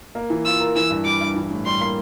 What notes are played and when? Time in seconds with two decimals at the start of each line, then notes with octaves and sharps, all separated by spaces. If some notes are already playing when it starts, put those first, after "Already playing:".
0.15 A#3
0.30 E3
0.45 F4 E6
0.60 A#4
0.76 E3 E6
0.90 G2
1.05 G3 D6
1.21 G2
1.36 E3
1.51 A2
1.65 G3 C6
1.81 A#3